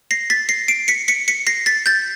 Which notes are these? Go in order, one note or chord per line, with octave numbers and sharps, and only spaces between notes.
A#6 C7
A6 B6
A#6 C7
C7 D7
B6 C#7
B6 C#7
B6 C#7
A#6 C7
A6 B6
G6 A6